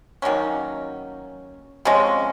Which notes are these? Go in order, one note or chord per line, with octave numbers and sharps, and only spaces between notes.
D#3 F#3 A#3 C#4
C3 F3 G#3 C#4